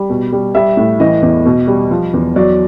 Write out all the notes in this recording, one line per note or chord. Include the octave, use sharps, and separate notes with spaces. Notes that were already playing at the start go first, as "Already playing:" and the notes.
Already playing: G3
B2
G3
G3 E5
A2
E3 D#5
E2
B2
G3
F3
E2
F#3 D5